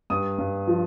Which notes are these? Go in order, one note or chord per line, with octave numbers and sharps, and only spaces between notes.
G2 D#6
G2
F3